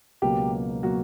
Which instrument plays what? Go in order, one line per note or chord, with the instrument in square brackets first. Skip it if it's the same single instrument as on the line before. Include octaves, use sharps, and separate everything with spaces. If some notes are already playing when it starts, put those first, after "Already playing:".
[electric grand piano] C#2 B2 F#3 A#3 [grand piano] G4
[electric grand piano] B2 F#3 A#3 [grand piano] F#4